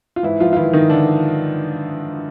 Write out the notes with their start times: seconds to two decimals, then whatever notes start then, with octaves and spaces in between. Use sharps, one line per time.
0.16 F4
0.23 G#2 E3 E4
0.40 F3 F4
0.53 F4
0.56 D#3 E3 E4
0.73 D#3 D#4
0.89 D3 D4